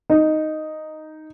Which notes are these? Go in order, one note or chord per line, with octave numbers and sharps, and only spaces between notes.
D#4